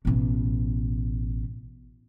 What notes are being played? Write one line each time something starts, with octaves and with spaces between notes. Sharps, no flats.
A1 B2